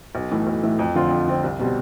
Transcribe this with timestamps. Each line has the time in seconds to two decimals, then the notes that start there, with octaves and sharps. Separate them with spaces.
0.15 B1
0.31 A2 E3 A3
0.47 B1
0.63 A2 E3 A3
0.79 F2
0.95 D3 F3 C4 F4
1.11 F2
1.27 D3 F3 C4 F4
1.43 C2
1.59 B2 G3 C4